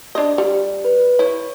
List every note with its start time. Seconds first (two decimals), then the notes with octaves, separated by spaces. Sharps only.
0.15 D4 D#5
0.38 G3
0.85 B4
1.19 E4 C#5